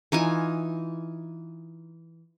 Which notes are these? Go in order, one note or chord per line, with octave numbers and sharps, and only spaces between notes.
E3 D#4 F4 G#5